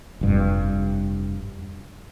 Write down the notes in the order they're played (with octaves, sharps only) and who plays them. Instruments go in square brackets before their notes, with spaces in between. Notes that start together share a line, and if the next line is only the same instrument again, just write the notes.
[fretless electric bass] F1 G2